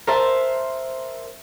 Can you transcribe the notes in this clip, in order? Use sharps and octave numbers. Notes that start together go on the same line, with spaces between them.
A#4 C5 E5 A5